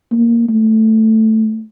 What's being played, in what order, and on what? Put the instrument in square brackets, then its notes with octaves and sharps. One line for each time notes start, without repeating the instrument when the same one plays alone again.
[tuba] A#3
A3